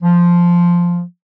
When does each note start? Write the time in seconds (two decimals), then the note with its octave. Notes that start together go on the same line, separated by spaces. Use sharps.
0.03 F3